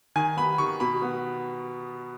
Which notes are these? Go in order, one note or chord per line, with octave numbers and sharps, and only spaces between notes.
D#3 G#5
B3 B5
D#3 C#6
B2 B5
B3